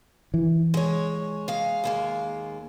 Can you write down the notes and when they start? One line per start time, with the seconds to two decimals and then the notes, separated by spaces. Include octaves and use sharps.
0.34 E3
0.74 G#3 C#5
1.48 G#3 F5
1.84 D#2 G#3 A#3